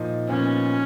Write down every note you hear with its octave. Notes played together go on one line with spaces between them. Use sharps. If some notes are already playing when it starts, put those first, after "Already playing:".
Already playing: A#2 F3 D#4
A#2 F3 B3 C#4 D#4